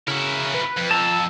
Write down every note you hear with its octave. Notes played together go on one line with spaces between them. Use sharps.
C#3 E4 F#4 A#4
B4
F2
A5 A#5 E6